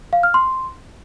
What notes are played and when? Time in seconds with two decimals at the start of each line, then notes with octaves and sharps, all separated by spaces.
0.13 F5
0.23 F6
0.34 C6